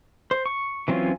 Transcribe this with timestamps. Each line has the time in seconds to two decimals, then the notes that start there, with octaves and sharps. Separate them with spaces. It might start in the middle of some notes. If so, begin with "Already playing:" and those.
0.31 C5
0.46 C#6
0.88 E3 F#3 C4 C#4 F4